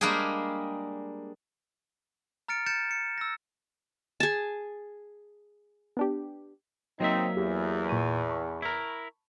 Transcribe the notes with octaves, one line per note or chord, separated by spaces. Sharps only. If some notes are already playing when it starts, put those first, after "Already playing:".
G3 G#3 A#3 D4 G4 G#4
A#5 F6 A6 C#7 D7
G6 A6 C#7 E7
C#7
E6 A#6
G#4 A5
B3 D4 G4
F#3 A#3 C4 D#4 E5
E2 G4
A#2 C#6 D#7
A5 B5 C#6
E4 A#4